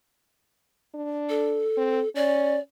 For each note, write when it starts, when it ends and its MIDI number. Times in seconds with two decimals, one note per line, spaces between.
0.94 1.67 62
1.29 2.09 69
1.77 2.01 60
2.15 2.58 61
2.15 2.59 74